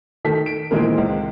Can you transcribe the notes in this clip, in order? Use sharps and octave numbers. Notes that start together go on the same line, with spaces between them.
D#3 A3 A4 B6
D7
A#2 D#3 E3 G#3 C4 A#4
C#2